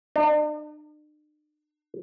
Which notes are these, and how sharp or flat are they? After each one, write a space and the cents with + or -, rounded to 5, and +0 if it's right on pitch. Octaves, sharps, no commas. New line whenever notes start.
D4 +45